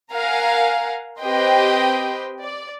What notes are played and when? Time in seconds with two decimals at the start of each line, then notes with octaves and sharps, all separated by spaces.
0.13 A#4 F5 F#5 G#5 A#5
1.21 C4 G4 B4 D#5 G5 C6
2.43 D5